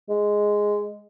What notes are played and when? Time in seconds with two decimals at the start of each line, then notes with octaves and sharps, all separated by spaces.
0.09 G#3